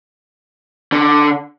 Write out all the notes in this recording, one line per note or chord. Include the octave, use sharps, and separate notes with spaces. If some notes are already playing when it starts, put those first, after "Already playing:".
D3